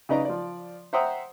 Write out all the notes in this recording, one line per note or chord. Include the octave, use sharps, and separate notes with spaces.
C#3 D#4 B4 D5 D#5 A#5
F3 D5
C5 E5 F#5 G5 A#5 D#6